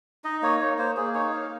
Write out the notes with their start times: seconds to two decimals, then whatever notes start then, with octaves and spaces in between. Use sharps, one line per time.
0.24 D#4 D#5
0.42 A#3 C#5
0.60 A#3 C#5
0.78 A#3 C5
0.97 A#3 G#4
1.14 D#4 C#5
1.33 A#3 F5